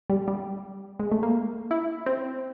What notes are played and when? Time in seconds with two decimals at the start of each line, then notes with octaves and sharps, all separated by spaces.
0.10 G3
0.28 G3
0.99 G#3
1.11 A3
1.23 A#3
1.71 E4
2.06 C4